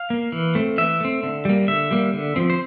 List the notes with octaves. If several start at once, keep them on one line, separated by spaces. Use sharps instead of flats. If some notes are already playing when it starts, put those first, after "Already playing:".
Already playing: F5
A#3
E3
A3 C4
E3 E5
A3 C4
D3
G3 A#3
D3 E5
G3 A#3
D3
F3 C4
C5